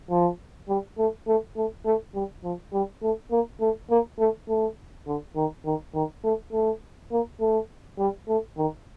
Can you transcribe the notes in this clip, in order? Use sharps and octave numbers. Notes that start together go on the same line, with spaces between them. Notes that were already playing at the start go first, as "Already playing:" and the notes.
F3
G3
A3
A3
A3
A3
G3
F3
G3
A3
A#3
A3
A#3
A3
A3
D3
D#3
D#3
D#3
A3
A3
A#3
A3
G3
A3
D#3